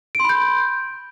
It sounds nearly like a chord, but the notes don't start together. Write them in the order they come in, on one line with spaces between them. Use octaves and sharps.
D7 C6 B5 G6